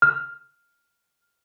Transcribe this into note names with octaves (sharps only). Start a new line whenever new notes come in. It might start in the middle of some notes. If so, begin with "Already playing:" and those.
F6